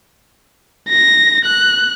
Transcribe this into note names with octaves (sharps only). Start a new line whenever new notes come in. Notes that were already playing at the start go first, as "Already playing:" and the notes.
A#6
F#6